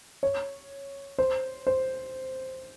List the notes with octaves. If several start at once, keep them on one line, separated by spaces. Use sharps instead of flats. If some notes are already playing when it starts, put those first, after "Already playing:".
C#5
C5
C5